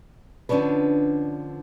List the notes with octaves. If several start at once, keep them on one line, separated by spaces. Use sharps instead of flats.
D3 F3 C#4 D4 B4